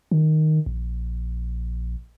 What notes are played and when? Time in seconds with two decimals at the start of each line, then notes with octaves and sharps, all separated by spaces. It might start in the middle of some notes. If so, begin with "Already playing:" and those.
0.11 D#3
0.66 A#1